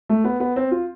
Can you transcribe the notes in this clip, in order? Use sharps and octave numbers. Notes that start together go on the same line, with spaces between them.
A3
B3
B3
C4
F4